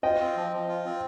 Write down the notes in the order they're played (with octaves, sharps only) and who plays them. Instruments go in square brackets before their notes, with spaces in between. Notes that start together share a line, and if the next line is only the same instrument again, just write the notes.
[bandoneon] F4 [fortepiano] D#5 G5
[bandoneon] C4
F3
F3
F4
C4